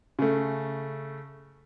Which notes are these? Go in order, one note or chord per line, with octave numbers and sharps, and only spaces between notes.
C#3 A3